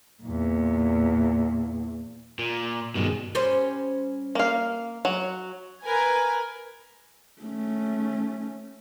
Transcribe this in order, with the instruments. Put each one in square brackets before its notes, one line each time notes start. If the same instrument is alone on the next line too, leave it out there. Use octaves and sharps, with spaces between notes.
[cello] E2 A#2
[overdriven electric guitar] A#2
[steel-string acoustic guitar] G2 G#3 [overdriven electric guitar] B2 D#3
[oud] G3 C#4 C5
[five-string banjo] A#3 F5
F#3
[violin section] A#4 B4 G#5
[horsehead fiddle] A3 C#4